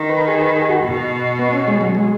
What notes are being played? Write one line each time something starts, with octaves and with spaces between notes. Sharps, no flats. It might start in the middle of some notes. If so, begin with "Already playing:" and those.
Already playing: D#3
B4
G#4
B4
G#4
F#4
B2
B3
C#4
G#3
F#3
G#3